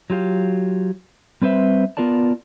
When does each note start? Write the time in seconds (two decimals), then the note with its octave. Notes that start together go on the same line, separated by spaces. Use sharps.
0.10 F#3 F4 G4 F5
1.42 G3 C4 B4 C5 E5
1.97 B3 F4 A#4 D5 A5